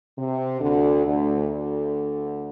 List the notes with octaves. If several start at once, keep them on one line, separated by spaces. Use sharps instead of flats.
C3
D2 D3
D2 D3
D2 D3